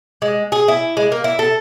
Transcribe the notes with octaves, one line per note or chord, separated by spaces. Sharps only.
G#3
G#4
E4
G#3
A#3
E4
A4